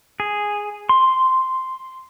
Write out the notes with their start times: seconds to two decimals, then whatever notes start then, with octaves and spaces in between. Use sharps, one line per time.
0.20 G#4
0.89 C6